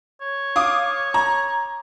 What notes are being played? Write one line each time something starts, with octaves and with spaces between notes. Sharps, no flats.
C#5
F5 D6 D#6
A#5